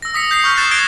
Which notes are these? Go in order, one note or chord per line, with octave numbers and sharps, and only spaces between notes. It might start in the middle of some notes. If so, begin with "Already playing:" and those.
E6 A#6
D#6 B6 C#7
G6 B6 C7
C#6 F6 G6
C#6 F#6 G6 A6 C7 E7
D#6 G#6 A#6 C7 D7 G7